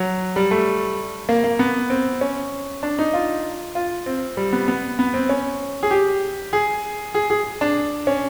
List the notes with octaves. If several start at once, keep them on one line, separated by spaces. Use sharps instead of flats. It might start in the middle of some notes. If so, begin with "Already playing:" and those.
Already playing: F#3
G3
A3
A#3
A#3
B3
C4
C#4
D4
D#4
F4
F4
C4
G3
B3
B3
B3
C4
C#4
G#4
G4
G#4
G#4
G#4
D4
C#4